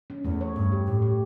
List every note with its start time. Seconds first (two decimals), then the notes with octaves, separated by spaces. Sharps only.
0.10 C#4
0.25 E2 A3
0.41 C#5
0.56 G2 C#5
0.72 G4
0.87 A2 A3
1.02 G4